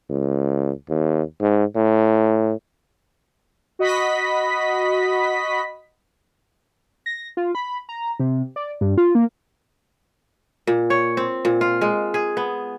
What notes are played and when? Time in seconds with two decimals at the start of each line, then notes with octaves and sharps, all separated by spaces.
0.10 C#2
0.89 D#2
1.41 G#2
1.76 A2
3.79 F#4 D#5 B5 B6
7.06 A#6
7.37 F4
7.55 B5
7.89 A#5
8.20 C3
8.56 D5
8.81 G2
8.98 F4
9.15 A#3
10.67 A#2
10.90 C#5
11.17 C4
11.45 A#2
11.61 F4
11.81 G#3
12.14 G#4
12.37 B3